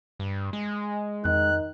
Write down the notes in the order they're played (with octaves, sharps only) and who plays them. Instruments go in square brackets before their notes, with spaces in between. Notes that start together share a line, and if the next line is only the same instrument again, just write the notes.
[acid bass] G2
G#3
[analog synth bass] F2 [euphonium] D#3 [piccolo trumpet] F#6